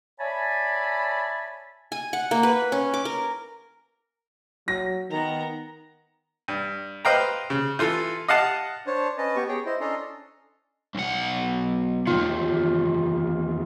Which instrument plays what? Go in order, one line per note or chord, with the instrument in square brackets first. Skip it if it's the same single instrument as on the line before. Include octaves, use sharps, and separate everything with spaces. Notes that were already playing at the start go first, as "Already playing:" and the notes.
[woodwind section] C#5 D5 E5 G#5 A5 B5
[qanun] G#5
F#5
A#3
B4
C#4
D6
A#4
[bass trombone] F#3 [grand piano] A#6
[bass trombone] D#3 [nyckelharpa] B3 A#5
[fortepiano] G2
B4 C5 D#5 F5 G5 A#5
C#3
E3 F4 A4
D#5 F5 F#5 A5
[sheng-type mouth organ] D4 C5 C#5 A5
C#4 B4 D#5 A5
B3 G4 C#6
G#4 C#5 G5
E4 C5 D#5
C#4 D4 A4 D#5 A#5 C6
[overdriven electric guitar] B1 F#5
[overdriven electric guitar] E2 D#3 [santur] F4